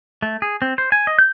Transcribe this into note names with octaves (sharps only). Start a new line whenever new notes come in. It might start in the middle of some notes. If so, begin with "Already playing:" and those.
A3
G#4
C4
C5
G#5
D#5
G6